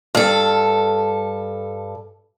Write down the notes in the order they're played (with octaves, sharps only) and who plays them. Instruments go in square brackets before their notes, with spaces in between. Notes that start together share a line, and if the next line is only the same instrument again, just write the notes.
[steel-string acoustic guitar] G2 A4